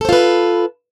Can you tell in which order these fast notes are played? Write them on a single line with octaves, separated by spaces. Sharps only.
A4 C5 F4 B4